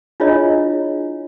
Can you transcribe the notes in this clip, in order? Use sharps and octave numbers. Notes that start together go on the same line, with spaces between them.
D4 E4 F4 G#4 C#5 D#5